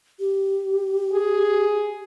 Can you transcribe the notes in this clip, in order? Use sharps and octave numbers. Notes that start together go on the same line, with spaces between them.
G4
G#4